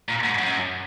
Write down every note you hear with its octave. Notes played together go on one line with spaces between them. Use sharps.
A#2
G#2
F#2